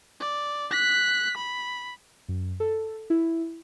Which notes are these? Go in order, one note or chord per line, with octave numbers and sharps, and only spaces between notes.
D5
F#6 B6
B5
F#2
A4
E4